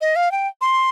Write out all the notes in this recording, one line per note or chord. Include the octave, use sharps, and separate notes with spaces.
D#5
F5
G5
C6